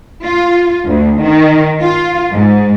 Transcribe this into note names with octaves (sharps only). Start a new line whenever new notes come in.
F4
D2
D#3
F4
G#2